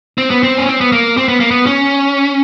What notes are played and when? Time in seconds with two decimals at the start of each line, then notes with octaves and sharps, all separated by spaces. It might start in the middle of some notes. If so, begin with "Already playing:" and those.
0.18 C4
0.31 B3
0.43 C4
0.57 C#4
0.69 C4
0.81 B3
0.92 A#3
1.17 C4
1.28 B3
1.40 A#3
1.51 B3
1.66 C#4